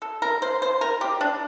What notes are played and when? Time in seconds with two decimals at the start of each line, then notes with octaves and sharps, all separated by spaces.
0.02 A4
0.22 A#4
0.42 C5
0.62 C5
0.81 A#4
1.01 G4
1.21 D4